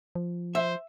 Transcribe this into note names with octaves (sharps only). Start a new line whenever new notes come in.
F3
C5 E5